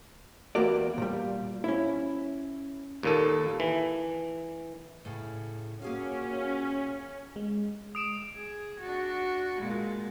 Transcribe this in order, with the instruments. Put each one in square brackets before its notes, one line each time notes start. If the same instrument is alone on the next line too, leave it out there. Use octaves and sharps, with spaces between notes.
[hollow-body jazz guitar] E2 A#3 F#4 G4 D5
A#2 G3
C#4 E4
[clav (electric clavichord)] D#2 A#2 A4
E3
[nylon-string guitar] A2 C#3
[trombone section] A#2 F#4 [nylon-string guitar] A#3 G#4 F5 [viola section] C#4
[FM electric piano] G#3
[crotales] D#6 D7 E7
[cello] G#4
D4 F#4
A#2 G#3